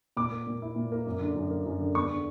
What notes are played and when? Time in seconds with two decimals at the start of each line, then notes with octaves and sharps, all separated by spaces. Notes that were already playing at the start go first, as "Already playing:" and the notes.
0.17 A#2 D6
0.31 A#3
0.47 A#2
0.62 E4
0.76 A#2
0.92 A#3
1.06 F#2
1.21 D3
1.36 F#2
1.50 A#3
1.66 F#2
1.81 D3
1.95 E2 C#6
2.10 D3